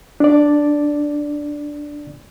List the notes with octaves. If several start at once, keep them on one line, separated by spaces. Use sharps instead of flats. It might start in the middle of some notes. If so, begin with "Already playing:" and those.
D4 D5